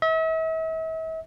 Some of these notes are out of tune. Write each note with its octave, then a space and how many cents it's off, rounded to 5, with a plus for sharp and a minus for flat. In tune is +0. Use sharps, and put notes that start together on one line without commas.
E5 -40